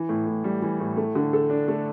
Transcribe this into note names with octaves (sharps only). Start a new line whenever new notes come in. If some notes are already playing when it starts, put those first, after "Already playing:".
Already playing: E3
A2
A2
G3
E3
A2
A3
D3
A4
D4
A3